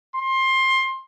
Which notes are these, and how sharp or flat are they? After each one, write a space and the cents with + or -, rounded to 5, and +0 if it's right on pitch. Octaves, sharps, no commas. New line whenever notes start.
C6 +20